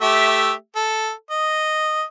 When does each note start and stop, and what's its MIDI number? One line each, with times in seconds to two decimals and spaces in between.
0.01 0.52 57
0.01 0.52 67
0.01 0.52 76
0.76 1.11 69
1.30 2.03 75